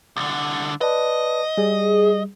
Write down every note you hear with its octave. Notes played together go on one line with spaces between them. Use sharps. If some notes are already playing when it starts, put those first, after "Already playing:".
C2 D3
B4 D5 D#5 A5
G3 G#4